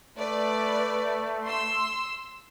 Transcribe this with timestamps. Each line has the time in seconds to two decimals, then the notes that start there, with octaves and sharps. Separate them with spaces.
0.18 A3 B4 D5
1.43 C6 E6